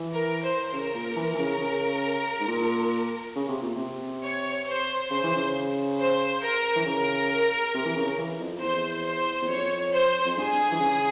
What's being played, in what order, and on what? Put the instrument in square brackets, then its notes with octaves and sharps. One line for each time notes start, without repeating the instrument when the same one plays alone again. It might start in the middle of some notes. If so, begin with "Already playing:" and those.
Already playing: [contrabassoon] E3
[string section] A#4
C5
[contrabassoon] C#3 [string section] A#4
[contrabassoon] A#2
E3
E3
C#3
C#3
G#2
A#2
C#3
C3
A#2
C3
[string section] C#5
C5
[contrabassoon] C#3 [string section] C5
[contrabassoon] E3
C#3
[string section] C5
A#4
[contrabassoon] E3
[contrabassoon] C#3 [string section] A#4
[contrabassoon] C3
E3
C#3
E3
F2
[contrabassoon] E2 [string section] C5
[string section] C5
[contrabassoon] E2
[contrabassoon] F2 [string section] C#5
[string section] C5
[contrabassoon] F2
[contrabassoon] G2 [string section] G#4
[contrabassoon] E3
C#3